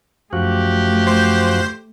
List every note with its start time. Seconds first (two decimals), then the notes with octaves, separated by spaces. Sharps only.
0.33 F#2 F3 A3 F#4 G4
1.07 C5